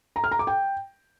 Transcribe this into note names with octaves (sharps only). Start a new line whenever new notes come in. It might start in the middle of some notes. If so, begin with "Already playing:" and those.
A#5
F6
A#5
D6
G5